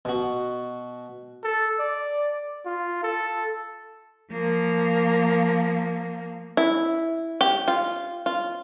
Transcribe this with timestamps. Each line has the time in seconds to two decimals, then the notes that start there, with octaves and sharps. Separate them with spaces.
0.05 B2 F#4
1.44 A4
1.80 D5
2.66 F4
3.03 A4
4.31 F3 A#3
6.57 E4
7.41 G4
7.68 F4
8.26 F4